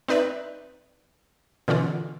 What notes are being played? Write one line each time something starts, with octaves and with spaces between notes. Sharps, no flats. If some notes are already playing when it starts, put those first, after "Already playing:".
C4 D#4 B4 D5 E5
B2 D3 E3 C#4 F4